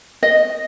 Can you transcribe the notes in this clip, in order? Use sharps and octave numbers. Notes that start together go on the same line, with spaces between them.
D#5